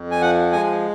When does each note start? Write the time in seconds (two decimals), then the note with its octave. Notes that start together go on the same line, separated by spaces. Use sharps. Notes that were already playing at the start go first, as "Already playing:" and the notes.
Already playing: F2
0.11 G#5
0.21 F3 F#5
0.52 G#3 G#5